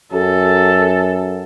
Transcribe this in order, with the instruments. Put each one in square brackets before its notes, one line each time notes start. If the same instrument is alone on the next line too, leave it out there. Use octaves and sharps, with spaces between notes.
[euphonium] F#2 [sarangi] A4